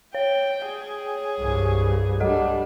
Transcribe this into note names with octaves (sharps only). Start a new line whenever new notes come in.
C#5 G5
G#4
C2 G2
G3 D4 A4 D#5 F#5